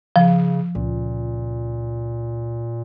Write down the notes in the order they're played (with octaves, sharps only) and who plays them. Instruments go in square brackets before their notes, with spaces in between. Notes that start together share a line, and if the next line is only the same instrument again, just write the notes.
[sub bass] C#3 [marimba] F3
[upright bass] C#2 [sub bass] A#2